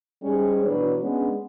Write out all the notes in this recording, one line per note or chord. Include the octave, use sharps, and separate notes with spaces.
G#2 G3 G#3 C#4 G#4
B2 E3 F#3 D4 B4 C#5
G#3 B3 C#4 D4